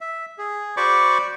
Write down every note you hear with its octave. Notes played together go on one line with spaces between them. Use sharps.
E5
G#4
F#4 C5 D5 B5 C#6 D6